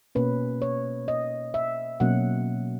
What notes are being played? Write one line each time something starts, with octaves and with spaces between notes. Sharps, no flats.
B2 A#3 C#4 B4
C#5
D#5
E5
B2 F#3 A#3 C#4 F#5